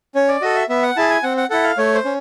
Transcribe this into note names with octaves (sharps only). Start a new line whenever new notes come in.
C#4 C#5
D5
F#4 A4 D#5
E5
B3 E5
F#5
E4 G#4 A5
G#5
C4 F#5
F#5
E4 A4 F#5
F5
A3 C#5
C5
C#4